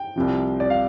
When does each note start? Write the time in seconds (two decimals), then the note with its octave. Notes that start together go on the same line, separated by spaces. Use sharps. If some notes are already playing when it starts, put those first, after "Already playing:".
Already playing: G5
0.16 C2 C3 F3
0.60 D5
0.70 F5